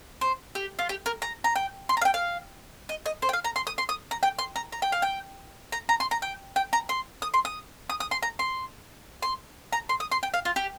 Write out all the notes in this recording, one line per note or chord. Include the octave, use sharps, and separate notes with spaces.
C5
G4
F4
G4
A#4
A#5
A#5
G5
C6
A#5
F5
G5
F5
D#5
D#5
C5
G5
F5
A#5
C6
D#6
C6
D#6
A#5
G5
C6
A#5
A#5
G5
F5
G5
A#5
A#5
C6
A#5
G5
G5
A#5
C6
D#6
C6
D#6
D#6
D#6
C6
A#5
C6
C6
A#5
C6
D#6
C6
G5
F5
F4
G4